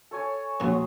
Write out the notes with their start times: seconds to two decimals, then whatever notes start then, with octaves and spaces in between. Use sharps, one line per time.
0.11 A4 C#5 G#5
0.60 A#1 D#3 F#3 C6 D#6